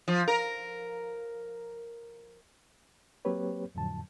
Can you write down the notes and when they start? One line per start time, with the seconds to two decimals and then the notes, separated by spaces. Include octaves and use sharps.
0.08 F3
0.28 A#4
3.25 F#3 A#3 C4 G4 B4 C#5
3.75 F2 A2 D3 F3 F#3 A5